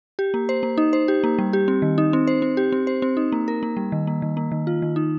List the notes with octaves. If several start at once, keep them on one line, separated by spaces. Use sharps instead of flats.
G4
A#3
C5
A#3
D#4
C5
G4
A#3
G3
G4
C4
D#3
D#4
C4
C5
C4
G4
C4
C5
C4
D#4
A#3
A#4
A#3
G3
D#3
A#3
D#3
A#3
D#3
F4
D#3
D#4